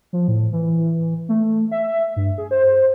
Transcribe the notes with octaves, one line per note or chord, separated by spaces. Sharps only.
F3
A2
E3
A3
E5
G2
G#4
C5